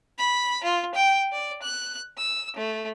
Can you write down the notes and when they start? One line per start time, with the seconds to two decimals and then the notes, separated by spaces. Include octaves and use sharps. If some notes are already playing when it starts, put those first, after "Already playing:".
0.19 B5
0.64 F4
0.95 G5
1.32 D5
1.62 F#6
2.18 E6
2.56 A3